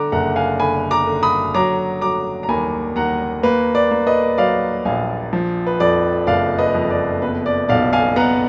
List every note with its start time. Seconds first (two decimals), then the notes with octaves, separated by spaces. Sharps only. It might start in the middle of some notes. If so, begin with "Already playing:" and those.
Already playing: D3 A#5 D6
0.12 F#1 F#5 A#5
0.36 F5 G#5
0.60 D3 G#5 B5
0.91 A#5 D6
1.07 D3
1.23 B5 D#6
1.55 F#3 A#5 D6
2.01 F#3 A#5 D6
2.43 A#5
2.49 D#2 G#5 B5
2.96 D#2 F#5 A#5
3.43 A#3 B4
3.75 D5
3.91 A#3
4.07 B4 D#5
4.38 F#3 D5 F5
4.85 A#1 F5 G#5
5.33 F3
5.66 B4
5.80 F2 D5
6.27 F#1 D5 F5
6.59 B4 D#5
6.75 F2
6.90 D5
7.22 B3 B4
7.46 D5
7.69 B1 D5 F5
7.93 F5 G#5
8.16 B3 F#5 A#5